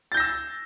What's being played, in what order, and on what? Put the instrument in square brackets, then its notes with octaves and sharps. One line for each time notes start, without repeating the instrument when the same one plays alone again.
[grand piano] A6
G6
A#6
E6